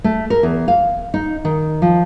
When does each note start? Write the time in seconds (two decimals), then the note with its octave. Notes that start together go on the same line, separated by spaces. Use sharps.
0.04 A3
0.30 A#4
0.43 E2
0.68 F5
1.14 D#4
1.45 D#3
1.82 F3